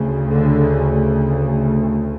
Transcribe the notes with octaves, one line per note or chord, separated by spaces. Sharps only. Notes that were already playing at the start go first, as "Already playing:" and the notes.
Already playing: D2 C#3
D3
C#3